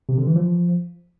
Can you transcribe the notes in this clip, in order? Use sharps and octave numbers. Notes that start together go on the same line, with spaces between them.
C3
D3
E3
F3